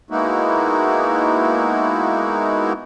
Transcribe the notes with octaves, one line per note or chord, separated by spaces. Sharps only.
G#3 A#3 B3 D#4 E4 F#4